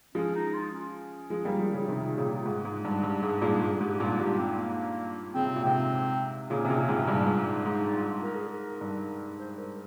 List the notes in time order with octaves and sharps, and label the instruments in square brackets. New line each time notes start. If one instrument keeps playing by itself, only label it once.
[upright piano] F3 G#3 [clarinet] C#4
[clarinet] D#4
F4
C#4
[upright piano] F3 G#3
G3 A#3
F3 G#3
C#3 F3
[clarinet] G4
[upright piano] C3 D#3 [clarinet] F4
[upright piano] A#2 C#3
G#2
G#2
G2
[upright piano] G2 [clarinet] G4
[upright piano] G#2 [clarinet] G#4
[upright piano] G2 A#2 [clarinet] G#4
[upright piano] G2 [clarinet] G#4
[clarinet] G#4
[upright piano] G#2 [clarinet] G4
[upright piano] G2 A#2 [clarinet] F4
[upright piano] G2 A#2 [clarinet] G4
[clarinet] C4
A#3
[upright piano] C#3 [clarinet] C4
[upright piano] C3
A#2
[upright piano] G#2 C3 [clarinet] C4
[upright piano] A#2 C#3 [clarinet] C#4
[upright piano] C3
A#2 C#3
G#2 C3
G2 A#2
G2
G#2
[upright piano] G#2 [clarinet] D#4
[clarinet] F4
A#4
G#4
A#4
[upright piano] G2
[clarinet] C5
A#4